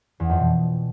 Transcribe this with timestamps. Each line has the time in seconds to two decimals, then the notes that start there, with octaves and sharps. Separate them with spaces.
0.20 E2
0.30 F2
0.39 B2